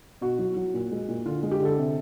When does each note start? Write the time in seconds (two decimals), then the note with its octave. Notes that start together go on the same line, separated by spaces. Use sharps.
0.21 B2 F#4
0.39 F#3
0.56 F#3
0.74 A#2
0.91 G#3
1.08 A#2
1.26 D3 F4
1.43 G#3
1.51 G4
1.60 D3 A4
1.78 C3